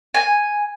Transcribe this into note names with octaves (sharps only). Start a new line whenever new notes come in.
G#5